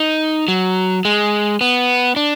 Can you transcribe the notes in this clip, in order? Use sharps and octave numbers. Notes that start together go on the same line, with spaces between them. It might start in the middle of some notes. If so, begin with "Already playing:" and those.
Already playing: D#4
F#3
G#3
B3
D4